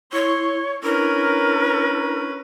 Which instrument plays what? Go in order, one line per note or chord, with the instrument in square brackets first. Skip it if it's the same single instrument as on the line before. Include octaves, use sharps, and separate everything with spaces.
[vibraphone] E4 C#6 [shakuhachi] C#5 [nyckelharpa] C6
[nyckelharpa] C#4 B4 [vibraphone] D4 E4 [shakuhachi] A#4